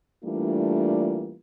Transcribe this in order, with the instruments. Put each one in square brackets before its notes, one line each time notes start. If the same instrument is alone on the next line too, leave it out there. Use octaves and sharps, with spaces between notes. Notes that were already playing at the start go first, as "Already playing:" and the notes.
[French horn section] E3 G3 A3 A#3 D4 F4